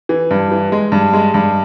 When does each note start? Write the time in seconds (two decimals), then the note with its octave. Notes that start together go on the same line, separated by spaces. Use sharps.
0.09 E3
0.31 G2
0.52 E3
0.72 G#3
0.92 G2
1.13 G#3
1.34 G2